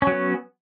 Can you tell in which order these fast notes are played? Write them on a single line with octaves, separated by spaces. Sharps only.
C#4 F#3 B3